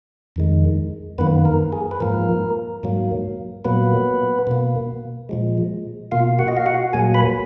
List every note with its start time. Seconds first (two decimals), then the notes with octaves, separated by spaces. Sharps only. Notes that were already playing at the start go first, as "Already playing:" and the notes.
0.36 F2 D#3 G#3
1.18 F#2 D#3 A#3 B3 B4
1.45 A#4
1.73 G#4
1.91 B4
2.00 G#2 F3 A#3 A#4
2.83 G#2 F#3 A#3
3.65 A#2 F#3 A#3 B3 B4
4.47 B2 A#3
5.29 A#2 F3 G#3
6.11 B2 A#3 F4 F5
6.39 F#4 F#5
6.48 D#5
6.57 F5
6.66 F#4 F#5
6.93 A#2 F#3 A#3 G#4 G#5
7.14 B4 B5